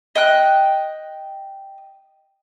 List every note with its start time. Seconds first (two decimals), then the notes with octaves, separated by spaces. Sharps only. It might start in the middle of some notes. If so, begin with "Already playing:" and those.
0.15 D#5 G5 F#6